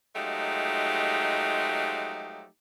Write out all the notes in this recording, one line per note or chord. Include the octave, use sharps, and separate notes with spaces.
F3 F#3 G#3 A3 D#4 G4